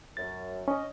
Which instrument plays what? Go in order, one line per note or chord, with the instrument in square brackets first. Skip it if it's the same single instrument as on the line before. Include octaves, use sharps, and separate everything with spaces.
[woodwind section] F#2 [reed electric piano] A6
[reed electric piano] C#4 [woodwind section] D#5